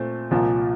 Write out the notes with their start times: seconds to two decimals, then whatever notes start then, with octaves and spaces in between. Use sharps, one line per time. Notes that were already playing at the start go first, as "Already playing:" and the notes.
Already playing: A#2 A3 C4
0.31 C2 A#2 F3 A#3